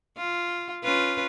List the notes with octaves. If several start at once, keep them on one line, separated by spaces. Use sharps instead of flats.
F4
C#4 F4 B4